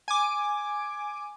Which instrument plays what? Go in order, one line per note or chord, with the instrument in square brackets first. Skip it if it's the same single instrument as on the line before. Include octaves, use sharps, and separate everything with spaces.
[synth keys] G#5 D6